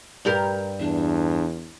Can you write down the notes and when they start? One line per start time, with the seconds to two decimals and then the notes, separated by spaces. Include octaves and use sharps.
0.25 G2 G4 A#4
0.80 E2 D4